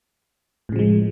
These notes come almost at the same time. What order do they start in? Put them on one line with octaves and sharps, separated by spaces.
A2 C#3 F3 G#3